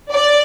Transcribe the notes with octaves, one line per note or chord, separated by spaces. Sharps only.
D5